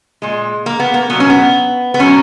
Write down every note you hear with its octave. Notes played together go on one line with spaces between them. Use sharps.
A#2 G#3
A#3
B3
A#3
B2 F#3 B3
C#4
B3
B3
B2 F#3 C#4